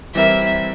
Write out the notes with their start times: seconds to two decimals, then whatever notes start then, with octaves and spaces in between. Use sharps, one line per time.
0.15 E3 G3 C4 E4 A#4 E5